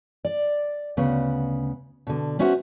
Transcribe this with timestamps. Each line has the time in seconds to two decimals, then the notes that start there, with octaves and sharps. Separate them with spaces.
0.25 D5
0.97 D2 C#3 B3
2.07 B2 D3
2.39 B3 C#4 F#4 C5 E5 F#5